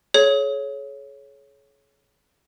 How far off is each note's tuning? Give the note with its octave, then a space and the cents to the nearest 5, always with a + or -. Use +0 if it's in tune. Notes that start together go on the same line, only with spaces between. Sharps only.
G#4 +40 C#5 +0